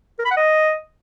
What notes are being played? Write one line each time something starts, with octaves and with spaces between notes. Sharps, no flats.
A#4
B5
F#5
D#5